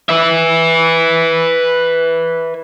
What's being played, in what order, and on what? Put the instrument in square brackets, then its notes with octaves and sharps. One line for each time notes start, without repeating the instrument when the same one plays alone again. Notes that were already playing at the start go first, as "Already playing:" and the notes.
[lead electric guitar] B4 E5